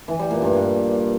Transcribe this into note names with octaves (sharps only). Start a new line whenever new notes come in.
E3
G3
A#2
G2
G2